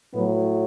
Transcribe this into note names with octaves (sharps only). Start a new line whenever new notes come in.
A2 F#3 B3